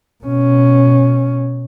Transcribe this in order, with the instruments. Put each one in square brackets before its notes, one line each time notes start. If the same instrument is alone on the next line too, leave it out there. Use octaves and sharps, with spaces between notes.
[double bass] B2 C#4